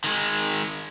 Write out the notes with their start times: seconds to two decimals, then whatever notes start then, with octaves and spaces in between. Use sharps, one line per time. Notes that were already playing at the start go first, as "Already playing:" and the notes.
0.04 D#3 G#3